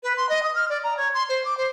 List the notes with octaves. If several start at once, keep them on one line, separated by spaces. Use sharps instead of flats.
B4
C6
D#5
D#6
F6
D5
A#5
C#5
C6
C5
D6
C5